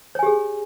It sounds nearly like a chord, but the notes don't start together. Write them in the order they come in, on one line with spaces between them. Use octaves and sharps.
C#5 G#5 G4 G#4